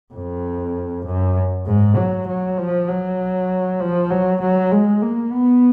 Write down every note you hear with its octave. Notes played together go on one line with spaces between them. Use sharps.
F2
F#2
G#2
F#3
F#3
F3
F#3
F3
F#3
F#3
G#3
A#3
B3